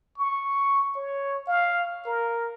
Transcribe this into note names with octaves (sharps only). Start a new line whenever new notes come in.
C#6
C#5
F5
A#4